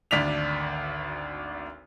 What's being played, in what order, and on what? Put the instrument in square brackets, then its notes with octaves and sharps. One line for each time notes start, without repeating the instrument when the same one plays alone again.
[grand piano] G#1 D2 D4 B6 F7